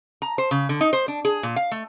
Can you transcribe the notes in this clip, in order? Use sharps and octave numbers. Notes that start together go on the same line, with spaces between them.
A#5
C5
C#3
D3
D#4
C5
D4
G#4
A#2
F5
A3